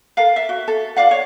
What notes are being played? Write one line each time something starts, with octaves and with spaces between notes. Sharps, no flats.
A4 A#4 F5
E5
F#4
A4
F4 D5 F5 F#5
C#5